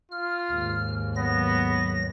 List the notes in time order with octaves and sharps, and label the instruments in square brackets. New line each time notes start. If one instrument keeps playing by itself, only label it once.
[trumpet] F4 [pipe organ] F6
[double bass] D#2 G#2
[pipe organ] F#3 A#6 [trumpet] B3